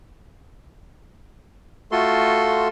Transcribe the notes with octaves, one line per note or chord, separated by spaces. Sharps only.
A3 F4 F#4 A4 C6